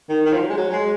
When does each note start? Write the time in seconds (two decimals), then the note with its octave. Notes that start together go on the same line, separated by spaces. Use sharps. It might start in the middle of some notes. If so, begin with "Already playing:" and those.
0.09 D#3
0.26 D#3
0.33 F3
0.41 F#3
0.49 G#3
0.57 F#3
0.70 F#3
0.73 G#3